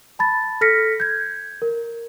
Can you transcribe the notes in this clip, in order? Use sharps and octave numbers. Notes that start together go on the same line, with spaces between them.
A5 B5 A6
A4 F6 A#6 B6 C#7
G6 G#6
A#4